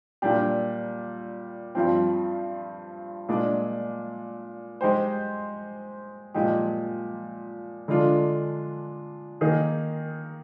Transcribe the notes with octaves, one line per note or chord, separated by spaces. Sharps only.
A#2 G3 D4 G4
G2 F3 C4
A#2 G#3 D4
G#3 D#4 G4 C5
A#2 F3 G#3 D#4 G4
D3 G#3 D4 F4
D#3 A#3 D#4 G#4